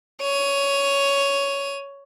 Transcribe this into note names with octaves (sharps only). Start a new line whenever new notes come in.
C#5 D#7